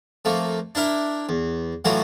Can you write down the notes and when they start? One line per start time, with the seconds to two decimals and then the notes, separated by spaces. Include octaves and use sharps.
0.25 F2 A3 A#3
0.75 D4 E4 A#4 E5
1.29 E2
1.85 F#2 A2 E3 F#3 A3 F4